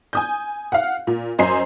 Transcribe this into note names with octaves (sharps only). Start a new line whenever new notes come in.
G#5 D#6 G6
F5 F#5
A#2
F#2 C5 D#5 G#5 C6 C7